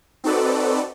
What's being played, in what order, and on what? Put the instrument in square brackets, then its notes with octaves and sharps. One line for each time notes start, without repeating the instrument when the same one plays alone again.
[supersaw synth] C4 D#4 F#4 A4 B4 D5